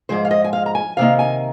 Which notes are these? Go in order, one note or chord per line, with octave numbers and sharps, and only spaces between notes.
G#2 F3 G#3 C5
F5
D#5
G#5
F5
A#5
G#5
C3 D#3 A#3 D#4 F5
G#5